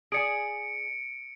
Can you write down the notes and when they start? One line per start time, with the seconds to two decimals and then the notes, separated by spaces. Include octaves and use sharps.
0.12 G#4 D5 G#5 C#7 D7